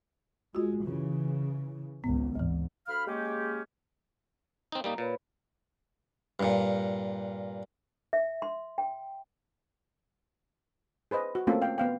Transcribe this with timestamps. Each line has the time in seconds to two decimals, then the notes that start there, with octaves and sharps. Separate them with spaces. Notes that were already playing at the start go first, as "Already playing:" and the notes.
0.55 G#3 F4 F#4
0.84 C#3 E3
2.04 G#1 C#2 B3
2.35 D2 G#2 E3
2.87 D2 F5 B5 F6
3.08 G#3 A#3 C#4 G4
4.72 C4 D#4
4.84 G3 A#3 D#4 A#5
4.98 A#2 B4 C#5 B5
6.40 G2 A#2
8.13 E5
8.42 C6
8.78 G5
11.11 G#4 B4 C5 D#5
11.35 F#4
11.47 A3 A#3 C4 C#4 F4 A4
11.62 F5 G5
11.78 B3 F5 G5